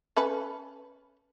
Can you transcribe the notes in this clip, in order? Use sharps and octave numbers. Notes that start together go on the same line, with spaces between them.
C#4 A4 B4